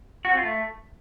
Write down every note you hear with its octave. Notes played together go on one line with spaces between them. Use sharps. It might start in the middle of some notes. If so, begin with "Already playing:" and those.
F#4
C4
F4
A3